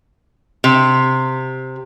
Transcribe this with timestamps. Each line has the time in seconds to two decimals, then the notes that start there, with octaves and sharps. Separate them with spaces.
0.64 C3